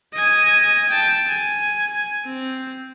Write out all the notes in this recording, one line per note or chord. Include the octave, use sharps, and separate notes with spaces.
D#5 G#5
G5 A5
G#5
C4